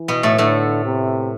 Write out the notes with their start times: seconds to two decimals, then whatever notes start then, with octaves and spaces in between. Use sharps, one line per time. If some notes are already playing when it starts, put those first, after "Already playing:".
Already playing: E3
0.08 B2 B3
0.23 A2 A3
0.38 A2 D3 A3
0.85 C3